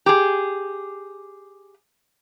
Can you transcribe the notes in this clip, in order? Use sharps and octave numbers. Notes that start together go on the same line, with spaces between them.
G4 G#4